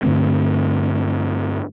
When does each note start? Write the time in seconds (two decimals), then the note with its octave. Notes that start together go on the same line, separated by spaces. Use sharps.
0.03 G2 D3 A3 C4